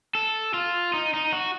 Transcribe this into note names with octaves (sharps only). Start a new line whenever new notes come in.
A4
F4
D#4
D#4
F#4